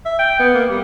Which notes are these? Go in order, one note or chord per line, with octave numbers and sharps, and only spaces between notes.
E5
G5
B3
A#3
G3